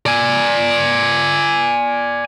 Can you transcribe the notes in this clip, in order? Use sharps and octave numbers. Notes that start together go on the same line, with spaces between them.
D5 G#5